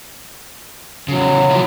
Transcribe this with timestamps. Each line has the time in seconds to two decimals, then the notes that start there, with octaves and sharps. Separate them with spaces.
1.08 C#3 E3 F#3
1.51 C3 F3 E4